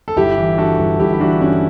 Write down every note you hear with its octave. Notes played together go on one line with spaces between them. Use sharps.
A4
G1 E4 G4
E3
G2 F#4 A4
G1
G1 E4 G4
E4
E3 D4 F#4
G2 C#4 E4